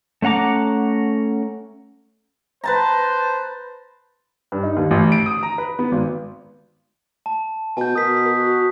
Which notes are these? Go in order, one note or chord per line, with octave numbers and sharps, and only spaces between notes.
A3 C#4 F#5 A#5 D6
B4 C5 A5 A#5
G2
D#4
D#2
A1
D7
D#6
A#5
B4
B3
G#1
A5
B2 G#5 G6
B2 A#4 D#6 B6
F#4